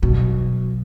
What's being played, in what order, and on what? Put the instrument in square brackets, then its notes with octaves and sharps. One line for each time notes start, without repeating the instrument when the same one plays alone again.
[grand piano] B1 [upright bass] B2